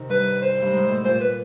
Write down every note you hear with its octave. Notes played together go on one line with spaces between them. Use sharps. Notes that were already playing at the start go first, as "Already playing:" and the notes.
Already playing: C3 D#3
G2 B4
C5
G2
G#2
A2
A#2 C5
B4